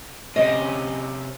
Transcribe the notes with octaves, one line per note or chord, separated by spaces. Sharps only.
C3 C#4 D#5